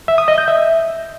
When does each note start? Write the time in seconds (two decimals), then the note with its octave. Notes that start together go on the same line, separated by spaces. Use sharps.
0.08 E5
0.18 D#6
0.28 D#5
0.38 G6
0.48 E5